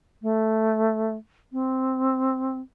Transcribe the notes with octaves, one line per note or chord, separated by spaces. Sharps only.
A3
C4